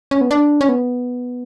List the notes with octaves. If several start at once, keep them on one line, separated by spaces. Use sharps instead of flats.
C#4
B3
D4
C#4
B3